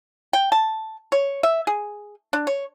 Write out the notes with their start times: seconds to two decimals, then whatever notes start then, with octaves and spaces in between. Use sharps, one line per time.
0.33 G5
0.52 A5
1.12 C#5
1.43 E5
1.67 G#4
2.33 D4
2.47 C#5